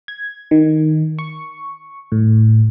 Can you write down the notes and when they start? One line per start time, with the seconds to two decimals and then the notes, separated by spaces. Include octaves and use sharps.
0.08 G#6
0.51 D#3
1.19 C#6
2.12 A2